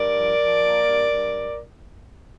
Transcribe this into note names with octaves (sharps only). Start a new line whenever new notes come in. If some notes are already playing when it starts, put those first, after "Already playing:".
Already playing: G2 A#4 D5
F3
F3
A#3
G2
G2